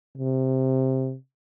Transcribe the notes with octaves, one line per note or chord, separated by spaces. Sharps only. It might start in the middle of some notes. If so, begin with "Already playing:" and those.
C3